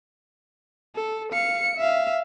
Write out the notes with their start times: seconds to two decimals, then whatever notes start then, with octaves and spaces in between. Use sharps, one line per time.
0.96 A4
1.33 F5 C#7
1.77 E5 F5